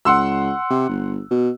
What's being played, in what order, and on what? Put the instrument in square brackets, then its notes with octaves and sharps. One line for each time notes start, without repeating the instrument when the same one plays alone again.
[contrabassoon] C#2 [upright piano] F#5 C6 E6
[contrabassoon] C3
G1
B2